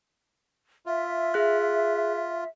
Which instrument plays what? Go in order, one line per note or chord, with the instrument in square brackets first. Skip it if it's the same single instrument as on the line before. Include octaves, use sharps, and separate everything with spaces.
[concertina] F4 [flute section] E5
[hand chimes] G#4 F#6